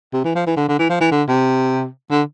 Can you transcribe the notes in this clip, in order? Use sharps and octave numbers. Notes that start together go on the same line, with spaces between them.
C3
E3
F3
E3
D3
D3
E3
F3
E3
D3
C3
D3